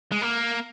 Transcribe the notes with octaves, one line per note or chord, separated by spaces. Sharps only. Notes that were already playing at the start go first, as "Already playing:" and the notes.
G#3
A#3